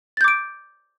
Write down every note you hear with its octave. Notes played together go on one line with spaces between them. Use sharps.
D6 G6 A6 D7